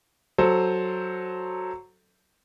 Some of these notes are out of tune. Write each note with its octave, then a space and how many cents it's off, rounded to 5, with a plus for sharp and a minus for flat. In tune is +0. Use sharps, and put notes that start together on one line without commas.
F#3 +0 A4 +0 C5 +0